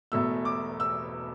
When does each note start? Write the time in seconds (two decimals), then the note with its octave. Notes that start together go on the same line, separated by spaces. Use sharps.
0.12 E1 E2 B2 A3 E6
0.45 D6
0.80 E6